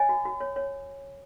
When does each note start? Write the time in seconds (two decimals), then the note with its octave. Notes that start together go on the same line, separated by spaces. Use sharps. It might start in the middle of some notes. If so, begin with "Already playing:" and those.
Already playing: C#5 D#5 G#5
0.09 F#4
0.25 F#4
0.41 C#5
0.56 C#5